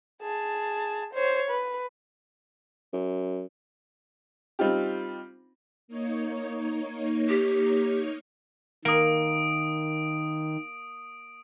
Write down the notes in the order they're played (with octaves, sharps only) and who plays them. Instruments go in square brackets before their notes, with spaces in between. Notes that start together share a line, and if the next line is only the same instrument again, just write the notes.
[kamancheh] G#4 A5
C5 C#5
B4
[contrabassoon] F#2
[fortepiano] G3 C4 D#4 F4 G4
[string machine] A#3 D#4 C#5
[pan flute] G4
[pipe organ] D#3 [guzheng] A#3 [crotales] D#6 D7